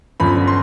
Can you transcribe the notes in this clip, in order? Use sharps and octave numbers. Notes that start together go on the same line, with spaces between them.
G1 F#2 D3 F3 B5
C6